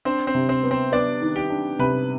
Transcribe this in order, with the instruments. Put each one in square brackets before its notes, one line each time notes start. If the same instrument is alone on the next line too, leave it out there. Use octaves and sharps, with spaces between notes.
[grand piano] C4 C5 [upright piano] D4
[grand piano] C4 C5
[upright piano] C3
[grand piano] C4 C5
[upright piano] B3
[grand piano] C4 C5
[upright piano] B3 [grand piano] D4 D5
[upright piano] D#3
[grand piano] G4 G5
[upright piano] D4
[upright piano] C3 [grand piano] B4 B5